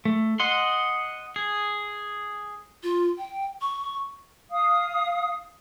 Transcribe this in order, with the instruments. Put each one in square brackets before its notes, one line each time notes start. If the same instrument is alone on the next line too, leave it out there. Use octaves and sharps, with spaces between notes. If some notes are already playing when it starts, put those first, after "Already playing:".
[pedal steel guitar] A3
D#5 F#5 C6
G#4
[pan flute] F4
G5
C#6
[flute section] F5 D#6